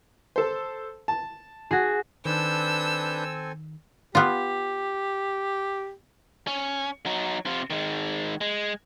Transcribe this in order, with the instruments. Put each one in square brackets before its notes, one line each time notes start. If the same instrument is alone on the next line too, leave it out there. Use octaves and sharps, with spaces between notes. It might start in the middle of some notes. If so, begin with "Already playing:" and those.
[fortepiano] A4 C5
A5
[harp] F#4 G#4
[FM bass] D#3 [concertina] C4 A4 G#5 [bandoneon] D4 B4 G6 [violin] E6
[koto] B3 F4 [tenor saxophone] G4
[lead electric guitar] C#4
F#3 D#4
C3 F4
D#3 G#3
G#3